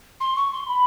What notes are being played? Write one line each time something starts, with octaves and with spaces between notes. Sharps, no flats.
C6
C#6
C6
B5